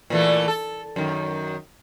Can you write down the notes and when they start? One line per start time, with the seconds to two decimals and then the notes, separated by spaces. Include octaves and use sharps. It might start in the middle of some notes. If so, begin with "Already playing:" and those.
0.10 A#2 E3 A3
0.48 A4
0.96 F#2 D#3